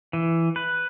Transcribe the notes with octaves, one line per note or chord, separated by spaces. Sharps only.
E3
B4